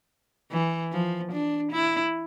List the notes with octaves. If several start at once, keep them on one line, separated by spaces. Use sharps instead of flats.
E3
F3
D4
E4